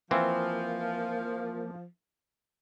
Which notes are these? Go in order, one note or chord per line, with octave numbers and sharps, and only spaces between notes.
E3 F3 A#3 C4